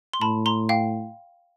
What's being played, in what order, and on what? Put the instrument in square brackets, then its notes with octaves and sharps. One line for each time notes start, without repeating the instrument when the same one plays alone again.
[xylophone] C6
[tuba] A2 [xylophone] A5 B5
[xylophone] A#5 C6
F5 G5